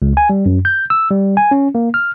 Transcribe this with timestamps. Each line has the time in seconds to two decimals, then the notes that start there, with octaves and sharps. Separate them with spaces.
0.02 C#2
0.17 G#5
0.30 G3
0.46 F#2
0.65 G6
0.90 E6
1.10 G3
1.37 G#5
1.51 C#4
1.75 A#3
1.94 F6